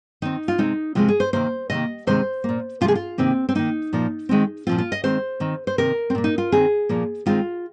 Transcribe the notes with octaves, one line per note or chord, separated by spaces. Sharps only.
D#3 C4 D#4
F4
C3 G#3 C4 D#4
C3 F3 G#3 C4 F4
G#4
C5
C3 D#3 A#3 C5
C3 D#3 A#3 D#5
C3 D#3 G#3 C4 C5
A#2 A#3
C3 F3 G#3 F4
G#4
F4
C3 D#3 A#3 C4
C4
D#3 A#3 D#4
A#2 F3 A#3
D#3 G#3 C4
A#2 F3 C4 F4
F4
D#5
D#3 G#3 C4 C5
D#3 C4
C5
C3 D#3 C4 A#4
C4
A#2 A#3
D#4
F4
D#3 C4 G#4
A#2 F3 A#3
D#3 G#3 C4 F4